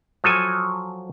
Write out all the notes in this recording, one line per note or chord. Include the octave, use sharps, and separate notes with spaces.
F3 F#3 A4 G#5